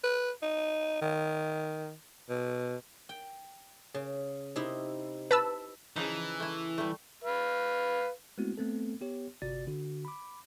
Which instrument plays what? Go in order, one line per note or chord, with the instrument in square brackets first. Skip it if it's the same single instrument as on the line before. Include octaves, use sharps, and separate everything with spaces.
[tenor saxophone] B4
D#4
D#3
B2
[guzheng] G5
C#3
C3 D#4 E4
[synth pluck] B4 A5 E6 [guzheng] B5
[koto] C#3 F3 D#4 [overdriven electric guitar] E3
[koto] A3 E4
G3 A3
[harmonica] B4 F5
[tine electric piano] G#3 A3 B3 C4 E4 F#4
A3 B3 C4 A4
B3 G4 C#5
G1 C3 F#4 D5 A6
D3 F#4
B5 D6